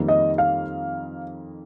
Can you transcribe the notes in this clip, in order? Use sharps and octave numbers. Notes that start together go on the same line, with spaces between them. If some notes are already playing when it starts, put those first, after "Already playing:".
Already playing: F2 D#3 G3 A#3
D#5
F5